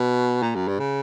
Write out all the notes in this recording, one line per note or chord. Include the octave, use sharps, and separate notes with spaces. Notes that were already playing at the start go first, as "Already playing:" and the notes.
Already playing: B2
A#2
F#2
G2
C#3